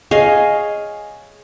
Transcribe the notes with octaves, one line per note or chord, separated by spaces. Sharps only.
G#4 C#5 D#5 F5